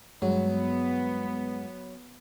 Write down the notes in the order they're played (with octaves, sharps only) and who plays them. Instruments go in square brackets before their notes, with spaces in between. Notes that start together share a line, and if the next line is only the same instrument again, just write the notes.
[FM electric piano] G2 G#3 [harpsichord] F#3 [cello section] B3